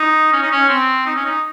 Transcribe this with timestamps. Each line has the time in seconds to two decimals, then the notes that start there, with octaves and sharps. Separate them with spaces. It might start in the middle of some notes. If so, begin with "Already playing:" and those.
Already playing: D#4
0.33 C#4
0.42 D#4
0.52 C#4
0.69 C4
1.06 D#4
1.16 C#4
1.25 D#4